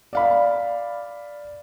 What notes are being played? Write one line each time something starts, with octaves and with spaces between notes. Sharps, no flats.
D5 F5 B5